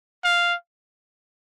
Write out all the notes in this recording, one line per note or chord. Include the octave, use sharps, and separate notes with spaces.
F5